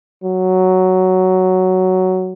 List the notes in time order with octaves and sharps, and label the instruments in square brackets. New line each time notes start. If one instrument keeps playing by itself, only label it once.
[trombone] F#3